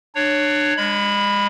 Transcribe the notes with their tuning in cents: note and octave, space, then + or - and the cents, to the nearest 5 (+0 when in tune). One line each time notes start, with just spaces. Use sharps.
D4 +25 C#5 +5
G#3 -30 B5 +0